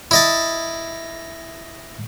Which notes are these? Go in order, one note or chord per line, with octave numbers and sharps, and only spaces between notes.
E4 D#5 A5